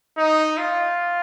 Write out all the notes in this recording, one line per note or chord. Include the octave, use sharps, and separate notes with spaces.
D#4
F4